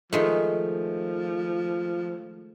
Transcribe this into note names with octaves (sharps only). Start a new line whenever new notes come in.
D#3 F3 G#3 A3